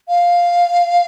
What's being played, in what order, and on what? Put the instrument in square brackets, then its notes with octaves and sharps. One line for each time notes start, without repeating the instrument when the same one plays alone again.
[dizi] F5